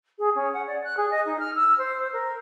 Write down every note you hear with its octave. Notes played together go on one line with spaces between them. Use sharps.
G#4
C#4
F#5
D5
F#6
G#4
D#5
D#4
F6
E6
C5
A#4